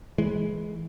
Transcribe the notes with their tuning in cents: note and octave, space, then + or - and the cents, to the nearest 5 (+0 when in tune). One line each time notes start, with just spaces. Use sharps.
E3 +0 G#3 +10